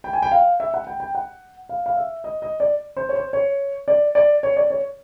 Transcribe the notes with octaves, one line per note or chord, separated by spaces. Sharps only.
G5
G#5
G5
F5
E5
F#5
G5
G5
F#5
F5
F5
E5
D#5
D#5
D5
C5
C#5
C5
C#5
D5
D5
C#5
D5
C#5